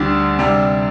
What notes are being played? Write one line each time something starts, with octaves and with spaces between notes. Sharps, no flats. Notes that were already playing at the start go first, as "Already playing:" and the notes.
Already playing: D2 D3 G3 D4
C3 G3 D4